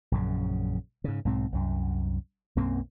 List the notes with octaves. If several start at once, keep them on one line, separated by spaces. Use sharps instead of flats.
A#1 F#2 C#3
G#2 C#3
B1 G#2 C4
C2 F#2
B1 F#2 A#3 C4